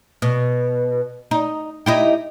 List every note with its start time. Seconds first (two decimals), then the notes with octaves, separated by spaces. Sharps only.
0.22 B2
1.31 D#4
1.86 D#4 E4 G4